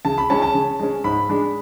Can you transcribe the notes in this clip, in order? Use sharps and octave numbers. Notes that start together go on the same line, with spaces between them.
C#3 A5
B5
G#3 C#4 A5
A5
C#3
G#3 C#4
G#2 B5
G#3 D4